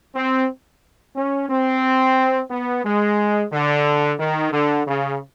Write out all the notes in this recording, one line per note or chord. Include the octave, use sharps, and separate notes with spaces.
C4
C#4
C4
B3
G#3
D3
D#3
D3
C#3